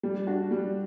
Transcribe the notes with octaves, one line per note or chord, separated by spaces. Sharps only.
G3
D4 F#4
G3